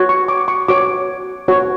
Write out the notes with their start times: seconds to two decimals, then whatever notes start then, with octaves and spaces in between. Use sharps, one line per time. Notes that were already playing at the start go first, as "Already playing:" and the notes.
Already playing: F#4 C#5
0.09 C#6
0.28 D6
0.48 C#6
0.68 F#4 C#5 D6
1.48 F#4 C#5